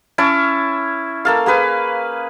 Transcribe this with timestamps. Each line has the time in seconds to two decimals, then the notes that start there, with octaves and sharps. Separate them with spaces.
0.18 C#4 E4 C#5 A5
1.25 A#3 A4 F5
1.46 A#3 G#4 B4 G#5